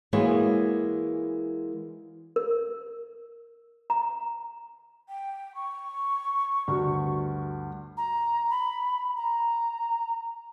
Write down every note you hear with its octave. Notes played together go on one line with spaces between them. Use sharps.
E3 G#3 A#3 B3 F#4 C#5
A#4
A#5
G5
C#6
D2 G2 F#4
A#5
B5
A#5